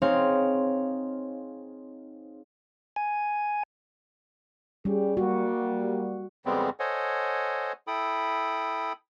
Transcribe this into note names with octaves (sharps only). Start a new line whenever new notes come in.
C4 D#4 G#4 C#5 F5
G#5
G3 C#4 G4 G#4
G3 A#3 F#4
F2 C#3 G3 G#3 B3 C4
A4 C5 C#5 D#5 F#5 G#5
E4 A4 G5 B5 D#6